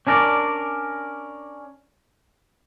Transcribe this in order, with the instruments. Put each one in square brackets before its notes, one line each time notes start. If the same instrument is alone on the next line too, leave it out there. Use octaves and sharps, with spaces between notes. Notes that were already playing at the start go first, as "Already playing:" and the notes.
[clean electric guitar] C#4 D4 A#4 D5